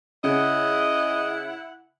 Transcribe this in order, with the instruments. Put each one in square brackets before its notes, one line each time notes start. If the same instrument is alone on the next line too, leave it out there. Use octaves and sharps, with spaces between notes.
[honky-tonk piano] C#3 [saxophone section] E4 F#5 [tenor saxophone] D#5